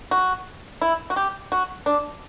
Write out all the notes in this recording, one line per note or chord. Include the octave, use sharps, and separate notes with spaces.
F#4
E4
F#4
G4
F#4
D4